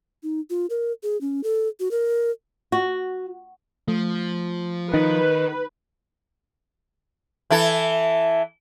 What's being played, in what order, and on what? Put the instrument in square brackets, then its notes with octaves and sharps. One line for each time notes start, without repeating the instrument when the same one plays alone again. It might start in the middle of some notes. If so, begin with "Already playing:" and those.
[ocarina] D#4
F4
A#4
G#4
C#4
A4
F#4
A#4
[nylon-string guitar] F#4
[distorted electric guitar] F3 [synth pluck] A3
[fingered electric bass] D#3 [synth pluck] D#4 [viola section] B4
[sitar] E3 E4 A4